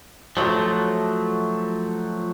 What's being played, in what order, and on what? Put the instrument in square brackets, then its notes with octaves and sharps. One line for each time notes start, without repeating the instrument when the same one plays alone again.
[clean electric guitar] F3 F#3 A3